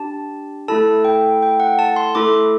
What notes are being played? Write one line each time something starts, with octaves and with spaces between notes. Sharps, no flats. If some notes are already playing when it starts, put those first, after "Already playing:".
Already playing: D4 G4 A5
A3 E4 A4 A5
G5
G5
F#5
A5
C6
A3 E4 A4 D6